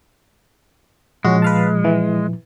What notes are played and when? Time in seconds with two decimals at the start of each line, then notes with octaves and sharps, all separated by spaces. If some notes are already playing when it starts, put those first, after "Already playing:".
1.25 A#2 F3 G#3 C#4 F#4
1.42 B4 F5 A5
1.84 E3